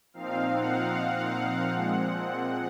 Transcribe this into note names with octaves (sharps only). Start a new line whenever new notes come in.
A#2 F3 C4 D#4 F5
F#5
A#2 F3 G#3 C4 F#5